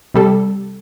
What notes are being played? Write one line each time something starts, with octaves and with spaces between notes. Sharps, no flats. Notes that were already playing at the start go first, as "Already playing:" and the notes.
C3 G3 A4